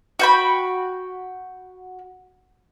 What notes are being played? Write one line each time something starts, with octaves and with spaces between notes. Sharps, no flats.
F#4 G5 B5